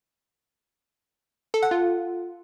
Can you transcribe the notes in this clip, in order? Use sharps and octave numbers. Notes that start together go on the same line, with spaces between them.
A4
F#5
F4